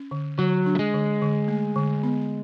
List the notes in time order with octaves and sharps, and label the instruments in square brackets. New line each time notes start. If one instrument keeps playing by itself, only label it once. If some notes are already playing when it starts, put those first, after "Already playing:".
Already playing: [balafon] C#4
D3
[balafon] D3 [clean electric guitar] F#3
[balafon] D4
[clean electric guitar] A3
G#3
[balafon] D3
D3
A3
D3
B3